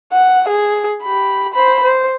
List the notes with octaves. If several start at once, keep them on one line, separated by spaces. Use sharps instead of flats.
F#5
G#4
G4 B5
C5 B5
C5